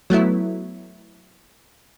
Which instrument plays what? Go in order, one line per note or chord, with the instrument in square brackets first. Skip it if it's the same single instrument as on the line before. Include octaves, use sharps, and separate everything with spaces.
[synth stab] F#3 A3 B3 E4